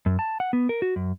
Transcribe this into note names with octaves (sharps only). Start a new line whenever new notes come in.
F#2
A5
F#5
B3
A#4
F#4
F#2